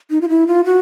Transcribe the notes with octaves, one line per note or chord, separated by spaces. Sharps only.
D#4
F4
E4
F4
F#4